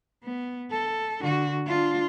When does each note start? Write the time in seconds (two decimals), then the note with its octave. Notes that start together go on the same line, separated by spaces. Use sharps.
0.23 B3
0.71 A4
1.21 D3 F#4
1.67 D4 F4